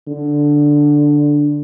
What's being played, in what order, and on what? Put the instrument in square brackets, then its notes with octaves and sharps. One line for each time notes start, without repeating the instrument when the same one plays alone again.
[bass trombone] D3